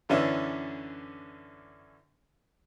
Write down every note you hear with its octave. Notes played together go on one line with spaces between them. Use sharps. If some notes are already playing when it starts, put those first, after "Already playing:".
F#2 D3 E3 C#4 D4 E4